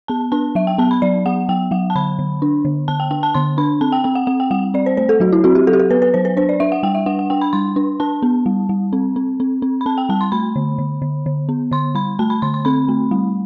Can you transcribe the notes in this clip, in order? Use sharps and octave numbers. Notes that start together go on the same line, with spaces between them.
B3 A5
D4 A5
F#3 E5
G5
B3 A5
B5
F#3 D5
B3 F#5
F#3 G5
F#3 F#5
A5
D3 B5
D3
D4
D3
D3 A5
G5
D4 G5
A5
D3 C6
D4 B5
C4 A5
G5
C4 G5
F#5
C4 F#5
G5
G3 F#5
C4 D5
C5
A3 C5
A4
F#3 F#4
E4
C4 F#4
G4
F#3 A4
G4
A4
B3 B4
B4
F#3 C5
B4
D4 C5
D5
D4 E5
F#5
G3 G5
E5
D4 F#5
F#5
D4 G5
B5
G3 C6
D4
D4 A5
B3
G3
G3
C4
C4
C4
C4
B5
C4 A5
G5
G3 A5
C6
A3 B5
D3
D3
D3
D3
B3
D3 C6
G3 B5
A3 A5
B5
D3 C6
C6
C4 B5
A3
G3